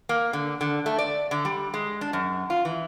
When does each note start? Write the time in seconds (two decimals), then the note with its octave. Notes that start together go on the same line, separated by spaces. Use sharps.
0.09 A#3
0.33 D3
0.61 D3
0.86 A3
0.98 D5
1.31 D3
1.45 G3
1.74 G#3
2.01 D4
2.13 F#2
2.50 F4
2.65 E3